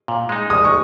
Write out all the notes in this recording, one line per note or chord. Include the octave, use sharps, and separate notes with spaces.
A#2
G#3 D#4
G#3 D#6
C#6